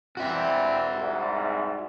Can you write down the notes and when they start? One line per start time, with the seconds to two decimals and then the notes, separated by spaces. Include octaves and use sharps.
0.17 E3 G3 C4 F#4 E5
0.92 C2 G#2